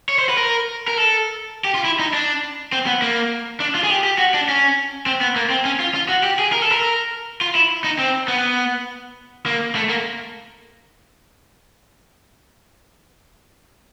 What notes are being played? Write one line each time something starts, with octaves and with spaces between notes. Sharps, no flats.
C#5
C5
B4
A#4
A#4
A4
G4
F4
E4
D#4
D4
C4
B3
A#3
D4
F4
G#4
G4
G4
F#4
D4
C#4
C4
B3
A#3
C4
C#4
F4
F4
F#4
G4
G#4
A#4
A4
A#4
F4
E4
D#4
C4
B3
A#3
A3
A#3